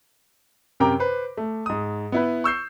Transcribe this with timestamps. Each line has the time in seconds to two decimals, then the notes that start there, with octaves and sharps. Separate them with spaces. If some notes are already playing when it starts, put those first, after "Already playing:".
0.80 F#2 C3 A#4 G5 A#5 D6
1.00 B4 C5
1.37 A3
1.66 G#2 D#6
2.12 B3 E4 B4
2.44 C#6 E6 G6 C7